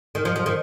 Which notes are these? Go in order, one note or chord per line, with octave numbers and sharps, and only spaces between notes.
D#3
F3
F3
D#3